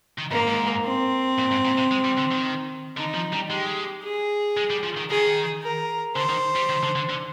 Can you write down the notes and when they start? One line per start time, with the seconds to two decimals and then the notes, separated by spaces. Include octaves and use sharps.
0.19 D#3
0.31 G#2 A#3
0.48 G#2
0.85 C4
1.39 A#2
1.51 G#2
1.65 A#2
1.78 C3
1.91 G#3
2.04 G3
2.17 D3
2.31 D#3
2.97 D3 D#4
3.15 F3
3.33 G3
3.50 G#3 G4
4.04 G#4
4.57 G#3
4.70 G3
4.83 F3
4.97 D#3
5.10 D#3 G#4
5.63 A#4
6.16 D3 C5
6.29 D#3
6.56 G3
6.69 D#3
6.83 D3
6.96 D3
7.09 D3